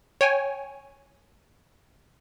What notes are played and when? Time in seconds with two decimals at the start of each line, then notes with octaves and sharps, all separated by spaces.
0.21 C#5 G5 G#5